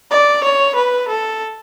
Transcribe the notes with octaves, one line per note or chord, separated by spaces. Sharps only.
D5
C#5
B4
A4